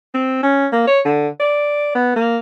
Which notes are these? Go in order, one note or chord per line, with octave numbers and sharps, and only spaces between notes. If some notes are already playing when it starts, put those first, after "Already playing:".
C4
C#4
A#3
C#5
D3
D5
B3
A#3